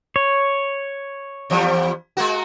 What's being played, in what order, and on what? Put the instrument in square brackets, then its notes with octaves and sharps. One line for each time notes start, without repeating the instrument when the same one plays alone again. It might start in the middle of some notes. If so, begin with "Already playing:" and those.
[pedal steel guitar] C#5
[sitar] E2 F3 G3
G#3 A#3 F#4